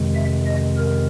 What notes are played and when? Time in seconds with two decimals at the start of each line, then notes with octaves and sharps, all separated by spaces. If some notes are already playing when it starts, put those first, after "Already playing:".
Already playing: F2 C3 D#3 G#3
0.16 E5
0.46 D#5
0.78 A#4